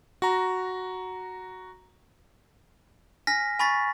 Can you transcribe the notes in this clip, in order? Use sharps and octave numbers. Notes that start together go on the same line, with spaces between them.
F#4 A#5
G#5 F6 A#6 B6
G#5 B5 C#6 A6 B6